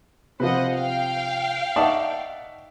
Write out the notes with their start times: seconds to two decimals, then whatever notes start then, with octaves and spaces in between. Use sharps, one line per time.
0.40 C3 F3 B4 C5 D#5 F#5
0.73 F5 G5
1.76 D#4 D5 E5 F#5 A5 C#6